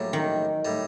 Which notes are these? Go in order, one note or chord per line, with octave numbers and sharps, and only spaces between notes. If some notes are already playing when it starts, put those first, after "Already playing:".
Already playing: A#1 A2 F#3 G3 D4
D#3
A2 G3